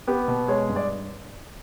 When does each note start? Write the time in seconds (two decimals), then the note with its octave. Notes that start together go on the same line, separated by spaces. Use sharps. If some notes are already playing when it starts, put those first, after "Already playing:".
0.07 B3 G4
0.28 B2
0.48 G#3 C#5
0.69 G2
0.76 D5